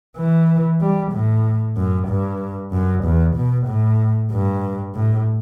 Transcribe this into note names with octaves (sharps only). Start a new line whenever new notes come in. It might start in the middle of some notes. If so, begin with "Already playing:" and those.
E3
G3
A2
F#2
G2
F#2
E2
B2
A2
G2
A2